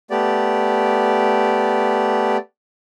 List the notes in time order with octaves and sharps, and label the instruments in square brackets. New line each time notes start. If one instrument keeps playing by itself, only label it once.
[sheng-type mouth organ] A3 B3 G4 D5